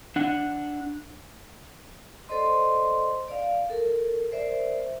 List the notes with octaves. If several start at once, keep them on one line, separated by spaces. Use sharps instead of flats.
D4 F#5
A4 C5 D5 D#5 C6
D5 F5
A4 A#4
A#4 C5 D5 E5